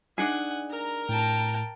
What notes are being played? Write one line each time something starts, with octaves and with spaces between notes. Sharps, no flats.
D4 D#4 G#4 F#5 G#5
A#4 A#5
A2 G5 A5